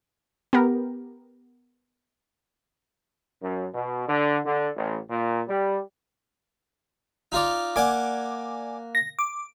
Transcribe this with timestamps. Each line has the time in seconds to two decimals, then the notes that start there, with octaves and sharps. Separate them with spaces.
0.53 B3 G4 A#4
3.41 F#2
3.73 B2
4.08 D3
4.46 D3
4.76 A1
5.09 A#2
5.48 G3
7.32 D#4 F4 D5
7.76 A#3 D5 F#5 G#5 D6
8.95 A#6
9.19 D6